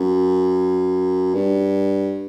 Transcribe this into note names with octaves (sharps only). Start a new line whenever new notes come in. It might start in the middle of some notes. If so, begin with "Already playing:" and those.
Already playing: F#2
G2